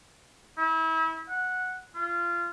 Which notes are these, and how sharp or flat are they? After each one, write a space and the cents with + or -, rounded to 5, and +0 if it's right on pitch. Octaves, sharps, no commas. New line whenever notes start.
E4 -30
F#5 -10
F4 -20